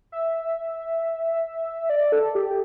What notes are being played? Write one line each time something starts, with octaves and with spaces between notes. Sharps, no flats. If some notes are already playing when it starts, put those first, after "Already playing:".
E5
D5
A4
G4